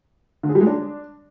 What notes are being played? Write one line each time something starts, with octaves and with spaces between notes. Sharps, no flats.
D3
G#4
G3
G#3
D4